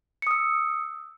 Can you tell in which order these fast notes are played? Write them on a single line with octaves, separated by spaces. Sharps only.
C#7 D#6 E6